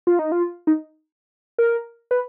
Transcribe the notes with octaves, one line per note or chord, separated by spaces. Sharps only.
F4
D#4
F4
D#4
A#4
B4